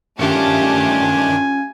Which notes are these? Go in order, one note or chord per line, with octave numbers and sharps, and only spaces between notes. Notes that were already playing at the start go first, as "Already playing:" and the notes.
G2 D#3 A3 C#4 D4 F4 G4 G#5